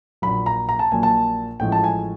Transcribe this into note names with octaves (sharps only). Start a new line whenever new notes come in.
A#1 A#2 F#3 B5
A#5
A#5
A5
A#1 A#2 F#3 G#5
A5
A1 A2 F3 G#3 G5
A5
G#5